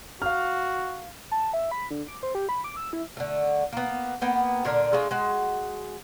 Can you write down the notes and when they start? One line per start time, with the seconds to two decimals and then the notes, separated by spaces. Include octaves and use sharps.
0.22 F#4 F5 F6
1.32 A5
1.53 E5
1.71 B5
1.91 D3
2.08 D6
2.23 C5
2.35 G4
2.49 B5
2.64 D6
2.76 E6
2.93 E4
3.17 D3 A3
3.73 A#3 B3
4.21 A#3 B3 G5
4.65 A#2 D3 D4 A#4
4.93 G#3 A3 D4 F4
5.11 G#3 F#4